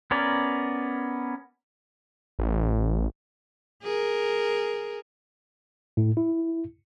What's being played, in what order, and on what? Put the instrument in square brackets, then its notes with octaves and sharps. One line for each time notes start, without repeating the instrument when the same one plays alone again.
[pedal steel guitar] B3 C#4 A#4 D5
[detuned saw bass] A1
[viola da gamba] G#4 A#4
[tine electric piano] A2
E4